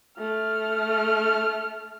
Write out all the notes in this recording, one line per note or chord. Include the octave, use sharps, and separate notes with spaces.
A3 F6